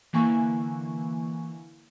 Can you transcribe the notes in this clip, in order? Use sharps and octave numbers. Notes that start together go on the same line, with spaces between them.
D3 E3 A#3 E4 G#5 C#6